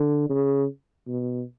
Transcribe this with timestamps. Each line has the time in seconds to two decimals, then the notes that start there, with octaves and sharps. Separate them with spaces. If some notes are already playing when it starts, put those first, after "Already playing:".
Already playing: D3
0.29 C#3
1.07 B2